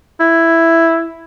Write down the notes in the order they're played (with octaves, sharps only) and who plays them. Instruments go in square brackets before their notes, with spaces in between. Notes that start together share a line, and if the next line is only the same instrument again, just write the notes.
[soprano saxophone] E4